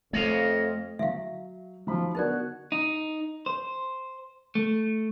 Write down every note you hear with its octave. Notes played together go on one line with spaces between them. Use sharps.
F2 A3 C#5 D#5 F5
F#3 E5 F5
F3 F#3 D#4 B5
D3 B3 D#4 F#4 A#4 D5
D#4
C5
A3